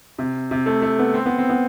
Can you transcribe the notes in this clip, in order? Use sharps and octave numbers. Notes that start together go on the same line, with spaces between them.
C3
C3
A3
A3
B3
C4
B3
C4
B3